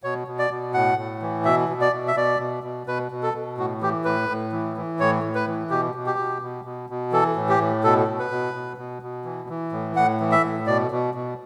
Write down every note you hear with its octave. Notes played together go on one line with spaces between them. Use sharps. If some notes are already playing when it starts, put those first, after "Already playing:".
B2 C#5
B2
D5
B2
A2 F#5
A2
E3
B2 E5
B2
D5
B2
E5
B2 D5
B2
B2
B2 B4
B2
A4
B2
A2 F#4
E3 G4
A2 B4
A2
E3
E3
A2 C#5
A2
B4
E3
B2 G4
B2
G4
B2
B2
B2
B2
E3 A4
A2
G4
A2
B2 A4
B2
B4
B2
B2
B2
B2
E3
E3
A2
A2 F#5
E3
E5
A2
B2 D5
B2
B2